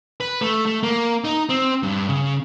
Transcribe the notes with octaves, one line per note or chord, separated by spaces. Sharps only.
B4
A3
A3
A#3
D#4
C4
G2
C#3